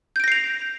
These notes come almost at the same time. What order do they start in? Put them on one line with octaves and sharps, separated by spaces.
G6 D7 A#6 C7 F7